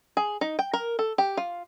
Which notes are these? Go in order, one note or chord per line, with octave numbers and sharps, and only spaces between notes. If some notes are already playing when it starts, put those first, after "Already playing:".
G#4
D#4
G5
A#4
A4
G4
F4